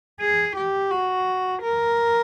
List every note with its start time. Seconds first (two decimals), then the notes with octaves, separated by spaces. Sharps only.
0.20 G#4
0.56 G4
0.91 F#4
1.63 A#4